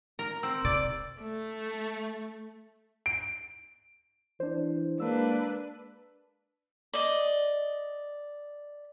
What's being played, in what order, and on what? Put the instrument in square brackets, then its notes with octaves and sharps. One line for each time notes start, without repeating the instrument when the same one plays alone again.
[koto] A#4
[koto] C4 [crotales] E6
[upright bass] C3 [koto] D5 [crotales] D7
[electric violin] A3
[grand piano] D7
[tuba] E3 [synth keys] D4 C5
[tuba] G#3 [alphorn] A#3 [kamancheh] D4 B4 [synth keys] E6
[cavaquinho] D5 D#5